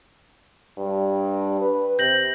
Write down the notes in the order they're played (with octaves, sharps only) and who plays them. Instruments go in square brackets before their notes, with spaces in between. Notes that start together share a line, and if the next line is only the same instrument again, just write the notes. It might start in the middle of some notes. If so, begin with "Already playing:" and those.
[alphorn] G2
B4
[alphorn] C3 [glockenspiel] G6 A#6 F#7